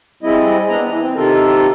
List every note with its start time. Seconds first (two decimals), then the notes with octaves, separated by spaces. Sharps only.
0.23 G3 G#3 C4 E4 D#5
0.69 B3 D4 D#5 A#5
0.87 E3
1.01 C4
1.16 C3 D#3 F4 A4 A#4